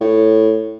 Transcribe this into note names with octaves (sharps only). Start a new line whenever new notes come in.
A2